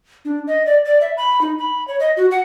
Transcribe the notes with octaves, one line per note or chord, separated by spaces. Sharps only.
D4
D#5
D5
D5
E5
B5
D#4
B5
C#5
D#5
F#4
F#5